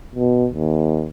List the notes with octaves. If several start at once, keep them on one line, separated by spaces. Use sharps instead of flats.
B2
D#2